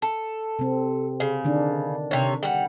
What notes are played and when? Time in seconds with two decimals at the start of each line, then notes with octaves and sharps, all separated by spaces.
0.02 A4
0.59 C3 C4
1.20 C#3
1.44 D3 D#3 D4
2.11 C3 C#5
2.43 G3 F#5